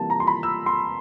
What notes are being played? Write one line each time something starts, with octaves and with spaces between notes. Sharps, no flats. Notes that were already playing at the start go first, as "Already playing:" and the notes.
Already playing: C3 E3 G3 A#3 A5
A#5
C6
B5
E6
C6